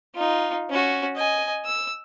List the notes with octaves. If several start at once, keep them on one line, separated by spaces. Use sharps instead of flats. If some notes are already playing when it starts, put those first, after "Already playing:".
D#4 F4
C#4 F#4
D#5 G#5
E6